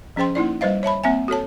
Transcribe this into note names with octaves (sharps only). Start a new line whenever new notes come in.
F3 C#4 G#4 C5 G5 C6
A#3 D#4 E4 D5
G3 B4 C5 D#5 F5
C#5 E5 A5 B5
A#3 C4 E5 G#5
F#4 A4 C#5 A5